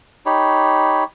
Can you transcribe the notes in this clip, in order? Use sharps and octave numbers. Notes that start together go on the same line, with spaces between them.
D#4 G4 C#5 B5